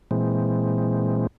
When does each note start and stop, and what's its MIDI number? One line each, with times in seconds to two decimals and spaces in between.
0.11 1.27 46
0.11 1.27 52
0.11 1.27 56
0.11 1.27 60